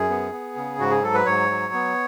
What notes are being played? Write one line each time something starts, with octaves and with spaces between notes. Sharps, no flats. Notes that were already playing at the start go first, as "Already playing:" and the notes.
Already playing: F#2 G#4
B3
B3
C#3
G#2 F#4
G#4
F#3 A4
B4
G#2 C#5
F#3
B3